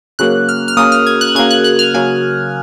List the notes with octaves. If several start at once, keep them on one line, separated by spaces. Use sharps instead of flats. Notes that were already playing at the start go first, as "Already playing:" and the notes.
C#3 F#3 A#3 F#6
F6
F6
C#3 F#3 A#3 D#6
F6
G#6
F#6
C#3 F#3 A#3 G#6
F#6
F#6
F6
C#3 F#3 A#3 G#5